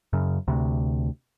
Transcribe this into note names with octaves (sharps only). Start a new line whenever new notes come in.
F#2 C#3
D2 C3